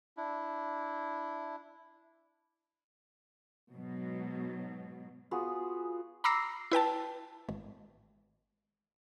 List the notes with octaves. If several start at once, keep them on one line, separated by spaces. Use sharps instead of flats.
D4 E4
G#2 B2 F#3
B3 F4 F#4 G#4
A#5 B5 D6 E6 A#6 C7
E4 B4 G5 A5
G#1